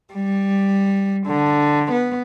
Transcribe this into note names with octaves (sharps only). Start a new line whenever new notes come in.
G3
D3
B3